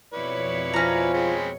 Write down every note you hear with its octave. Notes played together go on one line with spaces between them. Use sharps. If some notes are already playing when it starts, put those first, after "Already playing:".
F2 B2 E4 B4 C#5 D5
F3 C#4 A#5
G#3 C4 B5